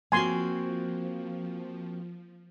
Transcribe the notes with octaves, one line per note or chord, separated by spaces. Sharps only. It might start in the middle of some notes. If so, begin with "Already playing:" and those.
F3 A#3 C4 F#4 G#5 C6